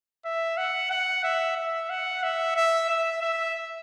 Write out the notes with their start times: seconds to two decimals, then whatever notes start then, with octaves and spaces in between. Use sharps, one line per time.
0.25 E5
0.57 F#5
0.91 F#5
1.24 E5
1.57 E5
1.90 F#5
2.23 E5
2.56 E5
2.89 E5
3.22 E5